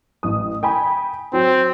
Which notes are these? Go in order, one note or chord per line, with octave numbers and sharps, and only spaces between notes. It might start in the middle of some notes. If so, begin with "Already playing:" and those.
A1 D#6
G5 G#5 B5
F#3 C4